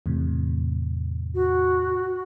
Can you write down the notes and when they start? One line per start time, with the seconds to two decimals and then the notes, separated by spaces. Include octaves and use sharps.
0.06 E2 A2 C3
1.35 F#4